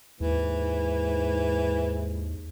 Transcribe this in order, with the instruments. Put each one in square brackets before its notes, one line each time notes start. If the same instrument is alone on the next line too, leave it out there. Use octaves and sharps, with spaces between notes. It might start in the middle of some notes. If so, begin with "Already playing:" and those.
[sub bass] D#2 [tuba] G#2 [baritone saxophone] E3